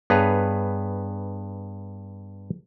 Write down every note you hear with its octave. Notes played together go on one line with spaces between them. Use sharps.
G2 B3 G#4 B4 C#5 A#5